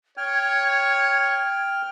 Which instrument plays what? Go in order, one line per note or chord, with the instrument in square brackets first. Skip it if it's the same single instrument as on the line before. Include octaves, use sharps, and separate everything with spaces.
[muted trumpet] C#5 [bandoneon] G5 F6 [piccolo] G#6